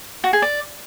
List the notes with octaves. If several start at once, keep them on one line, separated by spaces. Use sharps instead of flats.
F#4
G#4
D5